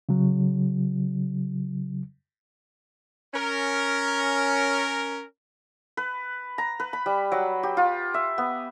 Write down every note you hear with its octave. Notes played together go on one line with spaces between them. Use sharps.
C#3 F#3
C#4 A#4
B4
A#5
B4
B5
G3
F#3
G4
F4
E5
B3